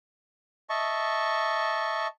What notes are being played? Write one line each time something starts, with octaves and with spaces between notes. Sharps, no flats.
D#5 E5 A5 C#6